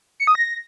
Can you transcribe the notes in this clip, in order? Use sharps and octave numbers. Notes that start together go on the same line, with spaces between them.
C#7
D#6
A#6